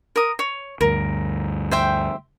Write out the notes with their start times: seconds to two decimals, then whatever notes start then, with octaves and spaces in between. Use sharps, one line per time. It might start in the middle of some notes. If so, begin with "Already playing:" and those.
0.16 A#4 D#6
0.39 C#5
0.81 D2 G2 A#4
1.71 C5 E5 G5